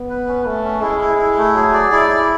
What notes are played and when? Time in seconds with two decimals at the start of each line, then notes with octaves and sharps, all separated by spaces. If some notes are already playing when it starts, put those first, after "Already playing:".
Already playing: B3
0.09 B4
0.28 C#4
0.46 A3 C#4
0.64 C#4
0.82 G#3 E4
1.00 E4
1.18 E4
1.37 A3
1.55 F#3 G#4
1.74 D5
1.92 G#3 E4
2.10 E4